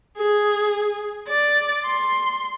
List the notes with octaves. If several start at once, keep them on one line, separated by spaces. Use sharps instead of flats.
G#4
D5
C6